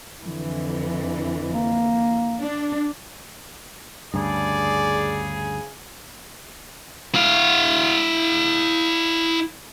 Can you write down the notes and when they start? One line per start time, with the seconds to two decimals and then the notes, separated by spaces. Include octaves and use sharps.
0.21 F2 D3 E3
1.53 A#3
2.40 D4
4.14 D2 G2 C#3 G#4 D5
7.15 E4 F5